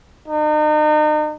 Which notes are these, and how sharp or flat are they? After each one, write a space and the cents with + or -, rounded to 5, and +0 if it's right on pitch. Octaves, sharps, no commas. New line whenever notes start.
D#4 -40